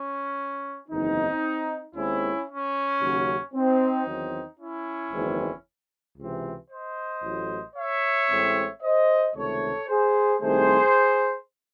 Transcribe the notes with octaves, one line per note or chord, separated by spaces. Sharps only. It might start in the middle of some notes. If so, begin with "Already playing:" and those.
Already playing: C#4
F#1 E2 D#3 C4 D#4
D#2 D#3 G#3 C4 C#4 E4
C#4
D#2 C#3 F#3
C4 D#4
E2 D#3 F#3 C4
C#4 E4
F#1 E2 D#3 G#3 C4
C#2 C3 E3 C4
C5 D#5
A1 A2 F#3
C#5 E5
A1 A2 G#3 C4
C5 D#5
C#2 C3 D#3 A3 A4 C#5
G#4 C5
C2 C3 D#3 A3 G#4 C5